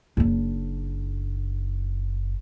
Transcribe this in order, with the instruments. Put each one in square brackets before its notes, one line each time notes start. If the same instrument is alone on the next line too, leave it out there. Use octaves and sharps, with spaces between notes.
[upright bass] F#1 D4